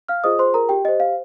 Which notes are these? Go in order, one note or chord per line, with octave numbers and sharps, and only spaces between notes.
F5 F6
F4 G#4 C5 D#5 D#6
C5 C6
A#4 A#5
G4 G5
G4 C5 D#5
F5